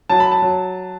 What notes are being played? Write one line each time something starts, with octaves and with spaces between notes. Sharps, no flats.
F#3 A5
B5
A5
F#3